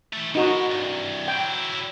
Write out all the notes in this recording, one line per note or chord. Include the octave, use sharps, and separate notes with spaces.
E3 A3
A2 D#4 F#4
C2 G2
F#3 E4 G5